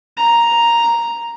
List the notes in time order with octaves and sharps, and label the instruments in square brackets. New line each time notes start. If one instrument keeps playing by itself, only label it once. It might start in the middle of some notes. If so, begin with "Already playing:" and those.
[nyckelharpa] A#5